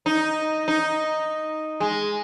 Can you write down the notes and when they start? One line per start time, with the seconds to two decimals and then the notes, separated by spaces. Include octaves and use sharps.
0.06 D#4
0.68 D#4
1.80 G#3